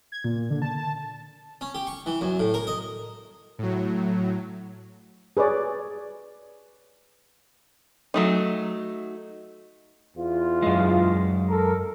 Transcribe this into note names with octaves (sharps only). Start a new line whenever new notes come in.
G#6
A#2
D3
A5
A5
C#4
G4
C#6
E3
F#2
A2
A#4
D#5
A2 F#3
G#4 B4 C#5 D5
F#3 A3 D#4
E2 F4
F#2 G#3
A4 A#4